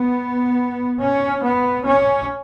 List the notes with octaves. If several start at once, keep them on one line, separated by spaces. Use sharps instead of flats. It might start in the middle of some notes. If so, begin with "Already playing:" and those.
Already playing: B3
C#4
B3
C#4